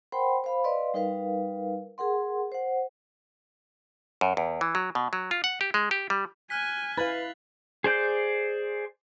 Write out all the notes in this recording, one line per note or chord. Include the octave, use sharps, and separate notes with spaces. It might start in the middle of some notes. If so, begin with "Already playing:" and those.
A#4 C5 F#5 G5 B5 C6
C5 F5 B5
B4 D5 D#5 F5 C6
G3 D#4 A#4 B4 F5
G#4 A#4 F#5 C6
C5 F#5
F#2
E2
E3
F#3
B2
F#3
F4
F#5
G4
G#3
G4
G3
G#5 F6 F#6 B6
E4 B4 F5 A6 F#7
G#4 C5 D5 G6